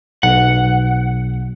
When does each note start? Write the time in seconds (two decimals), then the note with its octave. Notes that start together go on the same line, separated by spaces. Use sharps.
0.23 B1 F#5